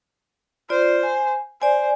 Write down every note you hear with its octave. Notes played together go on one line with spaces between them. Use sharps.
F4 C5 D5
G#5
C5 D5 G#5